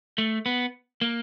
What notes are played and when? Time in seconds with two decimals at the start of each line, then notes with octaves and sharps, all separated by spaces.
0.18 A3
0.46 B3
1.01 A#3